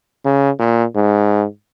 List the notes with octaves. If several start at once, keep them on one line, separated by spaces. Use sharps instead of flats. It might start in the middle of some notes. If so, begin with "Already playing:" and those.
C#3
A#2
G#2